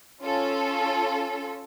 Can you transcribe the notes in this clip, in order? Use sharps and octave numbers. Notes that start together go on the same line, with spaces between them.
C#4 F4 A4